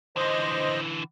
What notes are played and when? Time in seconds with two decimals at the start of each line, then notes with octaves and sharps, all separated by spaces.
0.16 D3 E3 C5 D#5